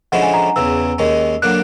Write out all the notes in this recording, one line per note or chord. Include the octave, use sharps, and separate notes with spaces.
D3 F3 G#3 C#4 E4 F#5
G#5
A#5
E2 C#3 E3 E6
D#2 D#3 G#3 C#4
D3 F#3 A#3 D4 F#6